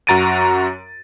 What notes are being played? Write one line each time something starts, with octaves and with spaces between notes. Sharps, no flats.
F#2 F#4 A#5 A6 D7 D#7